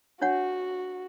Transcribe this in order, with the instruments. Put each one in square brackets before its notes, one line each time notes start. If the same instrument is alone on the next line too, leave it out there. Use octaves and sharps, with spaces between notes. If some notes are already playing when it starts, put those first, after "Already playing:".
[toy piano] D4 C#5 F#5 [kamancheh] F#4